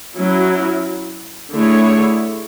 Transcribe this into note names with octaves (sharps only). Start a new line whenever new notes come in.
F#3 C#4 E4
D3 A3 E4 G#4 C#5